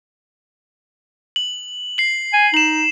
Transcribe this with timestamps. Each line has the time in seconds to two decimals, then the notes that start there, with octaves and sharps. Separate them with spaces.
1.36 F#7
1.98 C7 F#7
2.34 G#5
2.54 D#4 E7 F#7